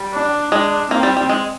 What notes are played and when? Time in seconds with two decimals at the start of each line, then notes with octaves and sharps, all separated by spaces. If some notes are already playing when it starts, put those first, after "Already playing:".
Already playing: G3
0.14 D4
0.52 G#3 D4
0.90 A#3 C4
1.03 G3
1.17 G3
1.29 G#3